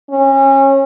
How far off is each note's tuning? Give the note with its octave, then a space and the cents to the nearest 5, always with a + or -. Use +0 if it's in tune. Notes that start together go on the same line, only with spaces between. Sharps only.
C#4 -30